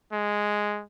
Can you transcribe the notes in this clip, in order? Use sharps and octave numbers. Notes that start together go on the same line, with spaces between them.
G#3